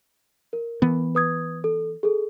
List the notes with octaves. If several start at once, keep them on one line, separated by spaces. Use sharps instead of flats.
A#4
E3 B3
B4 D#6 G#6
A4
G#4 A4